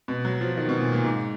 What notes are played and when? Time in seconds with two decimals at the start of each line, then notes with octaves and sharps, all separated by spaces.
0.08 B2
0.25 F#3
0.41 F3
0.57 D#3
0.69 B2
0.81 A#2
0.93 A#2
1.04 G#2